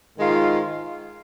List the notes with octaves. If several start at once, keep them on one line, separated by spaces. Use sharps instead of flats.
G#2 D#3 G#3 F4